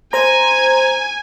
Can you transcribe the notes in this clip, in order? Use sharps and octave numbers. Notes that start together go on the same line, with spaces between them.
C5 G#5 A#5